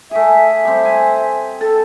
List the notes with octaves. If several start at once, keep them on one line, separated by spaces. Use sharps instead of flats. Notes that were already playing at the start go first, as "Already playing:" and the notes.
A3 G#4 E5
G3 C4
G#5
A4 A5